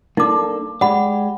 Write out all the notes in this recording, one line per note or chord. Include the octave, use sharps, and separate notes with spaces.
A#3 D4 D#4 A4 D6
G#3 G4 D5 F#5 B5